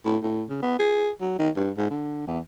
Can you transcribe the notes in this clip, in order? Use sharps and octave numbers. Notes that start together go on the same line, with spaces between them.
A2
A2
C#3
B3
G#4
F#3
D#3
G2
G#2
D3
E2